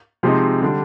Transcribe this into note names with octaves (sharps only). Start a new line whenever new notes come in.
C3 F3 G#3 C4 D#4
D3 G3 D4